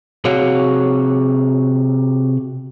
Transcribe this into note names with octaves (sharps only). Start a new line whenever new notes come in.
C3 F#4 G#4 C#5 F5